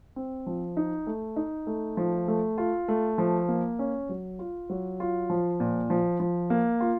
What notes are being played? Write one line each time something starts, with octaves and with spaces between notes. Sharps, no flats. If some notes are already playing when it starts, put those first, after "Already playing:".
C4
F3
D#4
A3
D#4
A3
F3
A3
F4
A3
F3
A#3
C#4
F#3
F4
F#3
F4
F3
A#2
F3
F3
A#3
F4